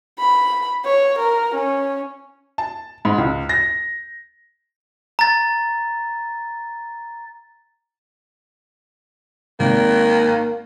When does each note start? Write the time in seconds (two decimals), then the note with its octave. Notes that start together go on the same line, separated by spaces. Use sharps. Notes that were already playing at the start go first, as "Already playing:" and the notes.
0.19 B5
0.85 C#5
1.19 A#4
1.55 C#4
2.58 A5
3.05 G#2
3.18 C#2
3.49 A#6
5.19 A#5 A6
9.60 G#1 D#3 A#3